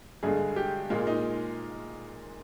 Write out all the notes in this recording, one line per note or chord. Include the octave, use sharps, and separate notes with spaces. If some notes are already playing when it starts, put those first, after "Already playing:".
G2 D3 G#3 G#4
G4
A#2 G#3 F4
D#4